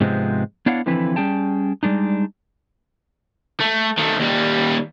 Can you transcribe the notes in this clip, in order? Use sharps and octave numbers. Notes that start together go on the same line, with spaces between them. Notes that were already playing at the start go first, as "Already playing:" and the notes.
G#2 C3 F3 G#3 B3 C4
B3 D4 E4 C#5 F5 F#5
D3 E3 F3 C4 E4 B4
G3 C#4 G#4 G5 A5
G3 G#3 D4 D#4
A3
D#3 A3
D#2 G3